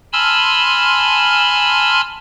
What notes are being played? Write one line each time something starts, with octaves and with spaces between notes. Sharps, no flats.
G#5 A5 B5 C6 E6 F6